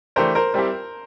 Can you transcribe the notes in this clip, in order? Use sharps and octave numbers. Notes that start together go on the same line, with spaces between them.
E3 A3 D4 G4 A#4 C5
A#4 C5
G3 C4 E4 G4